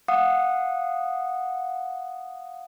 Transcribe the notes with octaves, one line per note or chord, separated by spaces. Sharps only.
F5 F#5 D#6